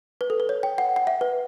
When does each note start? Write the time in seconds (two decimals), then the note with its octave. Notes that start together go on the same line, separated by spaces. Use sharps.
0.21 B4
0.30 A4
0.40 B4
0.49 C#5
0.63 G5
0.78 F#5
0.96 F#5
1.07 E5
1.21 B4